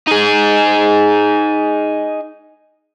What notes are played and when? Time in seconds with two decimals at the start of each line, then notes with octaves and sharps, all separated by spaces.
0.07 D#4 G#4